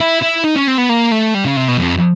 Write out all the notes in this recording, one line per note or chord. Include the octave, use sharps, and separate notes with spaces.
E4
E4
D#4
C#4
C4
B3
A#3
A3
G3
C#3
C3
B2
F2